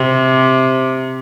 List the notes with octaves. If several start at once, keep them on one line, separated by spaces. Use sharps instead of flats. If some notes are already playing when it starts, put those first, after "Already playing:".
Already playing: C3